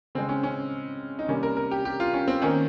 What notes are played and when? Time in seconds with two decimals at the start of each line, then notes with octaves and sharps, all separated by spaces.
0.15 C#3 G#3 C4
0.29 C#4
0.43 C#4
1.19 D#4
1.28 C3 G3 A#3 C#4
1.43 A#4
1.57 A#4
1.71 G4
1.85 G4
2.00 F4
2.14 C#4
2.28 C4
2.42 D#3 A#3 C#4